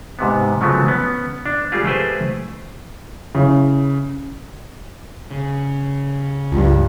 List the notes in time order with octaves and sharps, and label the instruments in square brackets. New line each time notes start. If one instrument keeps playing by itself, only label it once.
[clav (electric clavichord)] G#2 C3 B3
C#3 F3 F#3 G#3 A3 B3
B3 C#4
D4
G3 A3 F4 G4 G#4
A3 G4 G#4 B4 C5
[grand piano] C#3 E4
[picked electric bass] C#3
[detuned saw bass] C#2 [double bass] G2